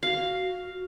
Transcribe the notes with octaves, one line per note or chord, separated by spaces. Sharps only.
F#4 F5